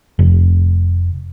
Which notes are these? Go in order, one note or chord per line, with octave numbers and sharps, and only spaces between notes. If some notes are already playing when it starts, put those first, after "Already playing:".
F1